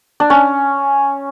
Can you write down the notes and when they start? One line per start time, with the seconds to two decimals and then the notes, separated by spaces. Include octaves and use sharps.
0.20 D4
0.30 C#4